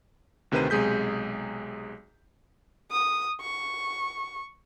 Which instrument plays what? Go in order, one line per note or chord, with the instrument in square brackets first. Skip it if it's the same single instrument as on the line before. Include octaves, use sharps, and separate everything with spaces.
[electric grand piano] D2 C3 D#3 B4 C5 D#7
B1 C3 G#3 G#4 G6 B6
[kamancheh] D#6
C#6